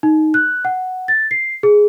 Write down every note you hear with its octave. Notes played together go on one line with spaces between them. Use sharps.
D#4
F#6
F#5
A6
C7
G#4